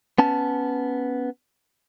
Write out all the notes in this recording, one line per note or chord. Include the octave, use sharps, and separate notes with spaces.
B3 C#4 A5